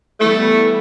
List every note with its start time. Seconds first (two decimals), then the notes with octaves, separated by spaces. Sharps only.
0.20 E3 G3 A3 B3 E4